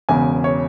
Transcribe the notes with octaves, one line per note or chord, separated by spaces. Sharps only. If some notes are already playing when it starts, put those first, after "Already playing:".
E1 E2 C#3 G#5
C#5